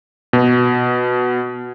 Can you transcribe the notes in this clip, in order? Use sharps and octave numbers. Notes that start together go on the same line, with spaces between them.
B2